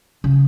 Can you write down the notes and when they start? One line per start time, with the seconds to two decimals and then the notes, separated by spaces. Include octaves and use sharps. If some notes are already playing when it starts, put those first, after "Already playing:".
0.24 C#3